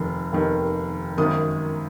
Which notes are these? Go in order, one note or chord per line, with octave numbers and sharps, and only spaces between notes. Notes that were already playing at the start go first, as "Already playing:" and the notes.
Already playing: F1 D#2 D#3
F1 D#2 D#3
G#1 F#2 D#3 D#6